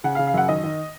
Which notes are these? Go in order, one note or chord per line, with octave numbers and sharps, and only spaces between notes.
C#3 F#5
F5
C#3
F5
F#2 F#5
D#3 D#5
D#3